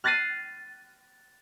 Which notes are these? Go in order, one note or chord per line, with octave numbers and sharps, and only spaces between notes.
F6 F#6 A6 A#6 C7 D#7